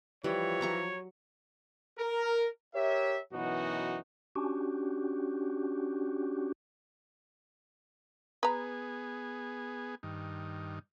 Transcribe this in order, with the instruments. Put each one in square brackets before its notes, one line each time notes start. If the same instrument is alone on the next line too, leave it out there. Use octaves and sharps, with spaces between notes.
[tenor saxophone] E3 [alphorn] F3 [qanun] G3 [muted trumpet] C#5
[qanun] F#3 A#5 C#6
[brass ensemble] A#4
G4 A#4 C#5 E5
F#2 B2 E3 D#4 F#4
[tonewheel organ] C#4 D4 F#4 G4
[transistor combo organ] B3 G#4 [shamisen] B4 A#5
[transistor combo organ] G2 D#3